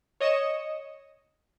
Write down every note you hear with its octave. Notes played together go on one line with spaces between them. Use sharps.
C#5 D#5 D#6 C#7 E7